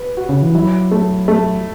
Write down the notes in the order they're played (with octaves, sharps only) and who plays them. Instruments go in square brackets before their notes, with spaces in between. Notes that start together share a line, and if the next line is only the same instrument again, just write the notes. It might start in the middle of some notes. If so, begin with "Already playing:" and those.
Already playing: [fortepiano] B4
F#4
[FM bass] C#3
E3
[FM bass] F#3 [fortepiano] E4
[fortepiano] A3
A3